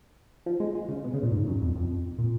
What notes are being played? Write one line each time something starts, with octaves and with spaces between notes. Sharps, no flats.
F3
G#3
G#3
C#3
B2
C#3
A#2
G#2
F#2
F2
F2
A#2